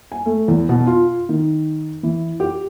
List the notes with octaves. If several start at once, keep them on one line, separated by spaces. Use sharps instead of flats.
G#5
A3
E2
B2
F4
D#3
E3
G4